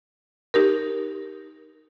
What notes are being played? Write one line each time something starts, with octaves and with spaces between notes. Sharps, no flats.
D#4 G4 A#4